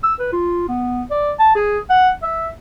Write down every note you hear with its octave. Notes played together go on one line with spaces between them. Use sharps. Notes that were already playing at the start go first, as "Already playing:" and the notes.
E6
B4
F4
B3
D5
A5
G#4
F#5
E5